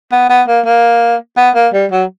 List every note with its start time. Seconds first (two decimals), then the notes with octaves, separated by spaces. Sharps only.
0.12 B3
0.29 B3
0.48 A#3
0.65 A#3
1.37 B3
1.55 A#3
1.73 G3
1.91 F#3